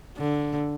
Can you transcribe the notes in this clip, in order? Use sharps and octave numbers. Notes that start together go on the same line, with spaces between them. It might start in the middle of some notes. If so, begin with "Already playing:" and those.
D3